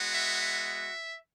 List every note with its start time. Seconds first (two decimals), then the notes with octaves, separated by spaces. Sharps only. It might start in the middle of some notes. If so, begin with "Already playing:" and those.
Already playing: G#3 B3 F#4
0.12 E5
0.41 E5